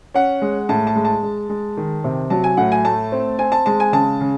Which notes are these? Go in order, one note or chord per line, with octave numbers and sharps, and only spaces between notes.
C#4 F#5
G#3
A2 A5
A5
G#3
A5
G#3
G#3
D#3
C3
F#3 A5
G#5
A2 F#5
G#5
A3 A5
C4
C4 G#5
A5
G#3 A5
G#5
C#3 A5
C#3